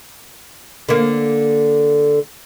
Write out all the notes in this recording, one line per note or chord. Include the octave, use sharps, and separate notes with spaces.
D3 A#3